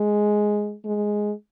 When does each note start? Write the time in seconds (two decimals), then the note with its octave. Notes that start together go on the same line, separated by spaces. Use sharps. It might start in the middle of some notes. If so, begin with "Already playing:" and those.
Already playing: G#3
0.86 G#3